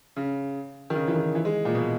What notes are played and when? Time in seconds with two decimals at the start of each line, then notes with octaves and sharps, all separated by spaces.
0.16 C#3
0.90 D#3
0.95 C#3
1.08 E3
1.15 D#3
1.35 E3
1.45 G#3
1.65 A#2
1.75 B2